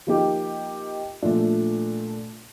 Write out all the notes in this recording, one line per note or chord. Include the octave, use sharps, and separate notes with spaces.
F3 A#3 D#4 G4 A#4
A#2 F3 A3 D4